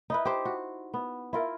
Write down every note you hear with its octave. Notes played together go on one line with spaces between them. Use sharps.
D#4 E4 B4
G4 C5
F#4
B3
E4 F4 A#4